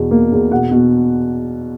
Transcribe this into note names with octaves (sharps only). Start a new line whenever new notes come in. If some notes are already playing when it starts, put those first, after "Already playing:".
Already playing: E2 B2
A#3
E2
B2 F#5
B2